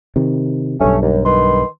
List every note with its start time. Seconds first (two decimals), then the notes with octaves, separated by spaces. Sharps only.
0.16 C3 D#3
0.81 B1 G2 A3 C#4
1.02 D#2
1.25 D#3 B4 C6